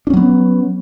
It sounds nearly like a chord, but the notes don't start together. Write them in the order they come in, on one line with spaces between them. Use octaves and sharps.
D4 C#4 F#3 B3